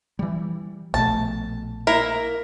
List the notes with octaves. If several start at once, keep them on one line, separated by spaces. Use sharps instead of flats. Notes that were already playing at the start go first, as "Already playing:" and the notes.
E3 G3
A#1 B2 A3 A5
A#3 E4 A#4